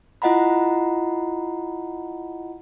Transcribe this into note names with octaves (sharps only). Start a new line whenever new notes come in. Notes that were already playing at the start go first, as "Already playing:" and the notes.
E4 F4 D#5 F#5 A#5 B5